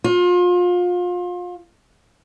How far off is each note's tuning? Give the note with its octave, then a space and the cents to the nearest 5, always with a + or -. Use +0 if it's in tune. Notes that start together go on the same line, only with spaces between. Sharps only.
F4 +30